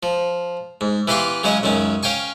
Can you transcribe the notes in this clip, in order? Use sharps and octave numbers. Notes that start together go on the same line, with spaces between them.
F3
G#2
E3 B3 G4 F5 C6 C#6
C#3 F#3 G#3 C#4 D#5
C#2 F#2 D#3 C#4
C#4 F5 G5 G#5 C#6